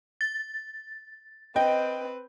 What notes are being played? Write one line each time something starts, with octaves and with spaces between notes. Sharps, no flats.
A6
C4 B4 D#5 G5